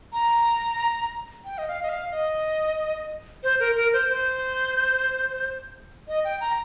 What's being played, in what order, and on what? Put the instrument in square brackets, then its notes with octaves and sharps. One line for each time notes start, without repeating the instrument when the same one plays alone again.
[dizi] A#5
G5
D#5
F5
D#5
F5
D#5
C5
A#4
A#4
C5
C5
D#5
G5
A#5